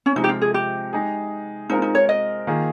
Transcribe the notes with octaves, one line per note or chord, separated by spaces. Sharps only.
C#4
C3 F3 G#3 D#4
G4
F4
G#4
G4
G#3 D#4 G#4
G#3 C4 D#4 F4 A#4
D#4
C#5
D#5
D#3 A#3 F4 G#4